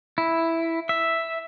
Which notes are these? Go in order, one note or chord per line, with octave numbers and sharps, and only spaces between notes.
E4
E5